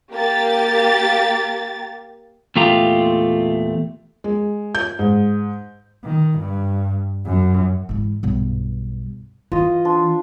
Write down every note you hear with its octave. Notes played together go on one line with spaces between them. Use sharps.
A#3 G4 A6
E2 A#2 A3 F4 G4 A#5
G#3
G6
G#2
D#3
G2
F#2
G#2 E3
B1 G2
E3 F4 D#5
D4 C6